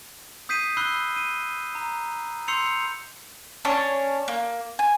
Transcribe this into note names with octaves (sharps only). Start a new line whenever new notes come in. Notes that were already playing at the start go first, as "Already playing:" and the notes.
D#6 G6 B6 C7 D#7
B5 E6 F#6 C7 G7
D#7
A#5
C6 E6 G6 C7 C#7 F7
C#4 D4 C#5 A5
A#3
G#5